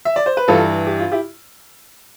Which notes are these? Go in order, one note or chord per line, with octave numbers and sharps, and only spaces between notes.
E5
D5
C5
B4
G2 E3 F4 A4
G4
F4
E4 G4